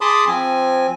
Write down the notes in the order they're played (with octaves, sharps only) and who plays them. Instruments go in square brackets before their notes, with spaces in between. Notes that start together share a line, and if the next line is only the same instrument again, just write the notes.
[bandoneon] G#4 A5 B5 C6 D6 D#6
F3 C4 G#5